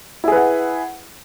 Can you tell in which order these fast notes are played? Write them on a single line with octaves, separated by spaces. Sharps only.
E4 G#4 B4 F#5